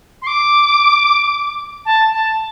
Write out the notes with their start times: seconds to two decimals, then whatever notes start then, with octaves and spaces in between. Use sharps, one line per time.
0.21 C6
0.26 D6
1.85 A5
2.11 A5